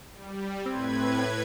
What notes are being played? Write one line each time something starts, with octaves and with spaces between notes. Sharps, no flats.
G3
A2 C4 B4 G#6